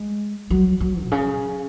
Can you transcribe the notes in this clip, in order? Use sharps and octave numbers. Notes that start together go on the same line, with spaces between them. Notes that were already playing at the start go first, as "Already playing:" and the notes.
Already playing: G#3
F#3
F#3
A#2
C#3